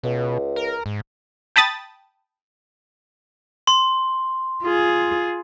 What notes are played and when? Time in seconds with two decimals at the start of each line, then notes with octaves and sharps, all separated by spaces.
0.04 C#2 B2
0.56 A#4
0.86 G#2
1.56 G5 A5 B5 D#6 A6
3.67 C6
4.63 F4 G#4